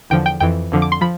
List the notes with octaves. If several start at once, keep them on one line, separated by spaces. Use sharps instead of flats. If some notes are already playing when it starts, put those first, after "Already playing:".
E2 D3 F3 G5
G5
F2 E3 G5
F2 D3 F3
D6
C6
F3 B5